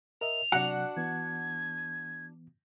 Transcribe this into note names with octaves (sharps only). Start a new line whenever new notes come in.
A#4 D#5 E5 F7
C3 F#3 D4 F#4 F#5
E3 B3 G#6